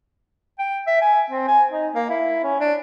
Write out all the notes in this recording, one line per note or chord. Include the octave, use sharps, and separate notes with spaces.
G5
E5
G#5
C4
G#5
D#4
A#3
E4
C#4
D4